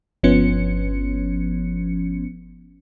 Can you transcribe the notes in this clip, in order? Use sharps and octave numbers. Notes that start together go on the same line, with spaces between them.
G1 F3 B3 C#4 C#7